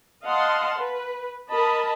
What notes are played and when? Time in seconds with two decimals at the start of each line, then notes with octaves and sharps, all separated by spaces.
0.25 D#5 F5 F#5 A5 C6
0.79 B4
1.50 A#4 D#5 A5 B5